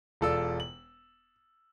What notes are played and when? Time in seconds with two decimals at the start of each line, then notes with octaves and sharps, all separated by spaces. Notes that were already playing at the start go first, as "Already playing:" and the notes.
0.21 E1 F4 A4 D5 E6
0.60 F#7